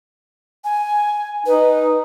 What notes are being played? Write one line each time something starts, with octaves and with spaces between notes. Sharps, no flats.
G#5
D#4 B4